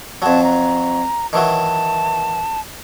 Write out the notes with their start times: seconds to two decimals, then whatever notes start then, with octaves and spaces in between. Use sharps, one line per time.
0.22 F2 F#3 A5
0.43 A#5
1.33 D#3 E3 F#3 A5